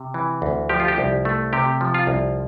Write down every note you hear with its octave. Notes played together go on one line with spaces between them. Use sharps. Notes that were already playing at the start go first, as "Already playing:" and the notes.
Already playing: C3
E3
D2
F3 G4
F4
G4
C2
A3
C3 G4
F3
F4
C2